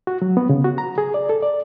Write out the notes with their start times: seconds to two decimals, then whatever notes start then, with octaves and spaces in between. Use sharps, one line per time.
0.07 F#4
0.22 F#3
0.37 B3
0.49 C#3
0.64 F#4
0.78 A#5
0.98 G#4
1.14 D5
1.29 A4
1.43 D5